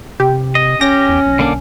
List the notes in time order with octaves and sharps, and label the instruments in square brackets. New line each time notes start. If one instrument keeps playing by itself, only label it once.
[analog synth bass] C3 [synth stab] G4
[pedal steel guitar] D#5
[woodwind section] C#4 [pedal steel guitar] G4 [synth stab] A#6
[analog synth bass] E2
B1
[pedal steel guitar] D3 A#3 D4